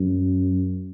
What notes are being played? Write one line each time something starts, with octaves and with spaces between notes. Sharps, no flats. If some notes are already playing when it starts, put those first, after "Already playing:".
Already playing: F#2